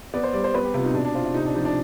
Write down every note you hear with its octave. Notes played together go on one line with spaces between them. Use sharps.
B3 D5
C5
G3 D5
C5
B3 B4
G4
C3 F4
D#4
B2 D4
D4
C4 F4
F4
C3 D#4
D4
F3 D#4
D4